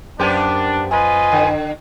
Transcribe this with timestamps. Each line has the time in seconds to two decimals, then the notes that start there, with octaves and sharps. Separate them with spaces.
0.19 F#2 A#3 B3 D4 G4 C5
0.91 F4 B4 D#5 G#5
1.32 D3